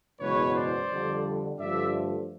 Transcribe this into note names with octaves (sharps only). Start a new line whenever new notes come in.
F#1 E2 B2 G#3 B4 C#5
C5 D5
F2 D3 G3
G2 D3 F3 A3 D5 E5